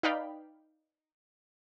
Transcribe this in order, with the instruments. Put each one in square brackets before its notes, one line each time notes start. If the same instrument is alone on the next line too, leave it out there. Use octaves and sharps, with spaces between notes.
[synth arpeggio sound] D#4 B4 D5 F5 G5 B5